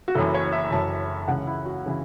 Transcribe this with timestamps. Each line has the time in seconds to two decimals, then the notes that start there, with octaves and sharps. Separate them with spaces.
0.08 F#4
0.15 F#1 F#2 E3 A4
0.34 C#5
0.52 E5
0.71 F#1 F#2 E3 A5
1.28 C#2 C#3 E3 F#5
1.47 E4
1.66 F#4
1.86 C#3 E3